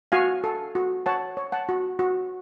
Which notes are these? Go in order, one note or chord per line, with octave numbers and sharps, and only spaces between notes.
F#4 F5 G#5
A4
F#4
C#5 F#5 A5
C#5
F#5 A5
F#4
F#4